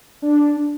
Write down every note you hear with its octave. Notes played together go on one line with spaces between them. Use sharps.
D4